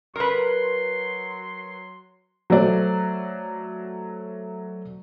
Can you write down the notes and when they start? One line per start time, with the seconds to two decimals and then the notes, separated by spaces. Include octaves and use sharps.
0.16 F#3 A#4 B4 C6
2.50 F#3 A3 C5 D5